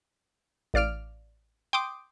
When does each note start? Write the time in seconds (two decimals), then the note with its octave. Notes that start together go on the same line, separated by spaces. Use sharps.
0.74 A1 D5 F5 F6 D7
1.73 G5 C6 D6 D#6